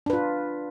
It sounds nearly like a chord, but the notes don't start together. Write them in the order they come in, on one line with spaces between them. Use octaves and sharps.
D4 B4 F4